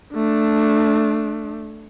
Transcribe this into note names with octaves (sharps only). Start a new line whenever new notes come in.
A3 D4